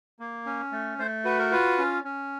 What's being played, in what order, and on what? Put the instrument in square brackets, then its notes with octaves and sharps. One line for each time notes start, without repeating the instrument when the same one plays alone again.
[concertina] A#3
C#4
A3
A3 C5
F#4 B4
A#4
F4 B4
C#4
C#4